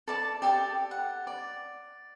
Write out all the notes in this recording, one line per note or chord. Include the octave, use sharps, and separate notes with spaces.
A4 D5 A5
G4 A4 D5 G5
F#5
D5